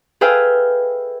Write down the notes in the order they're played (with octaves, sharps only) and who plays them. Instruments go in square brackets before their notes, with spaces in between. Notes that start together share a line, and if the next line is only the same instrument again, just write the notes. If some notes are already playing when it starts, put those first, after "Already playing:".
[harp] G#4 A4 B4 E5 F5 G5